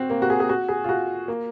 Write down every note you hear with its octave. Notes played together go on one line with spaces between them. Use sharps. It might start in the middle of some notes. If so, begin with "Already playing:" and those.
Already playing: C4 F#4
A#3
F#4
G#4
G#4
F#4
G#4
F4
F#4
A#3